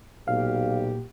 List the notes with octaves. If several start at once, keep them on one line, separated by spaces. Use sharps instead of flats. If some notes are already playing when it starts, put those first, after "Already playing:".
B1 A#2 G3 F#4 G4 F5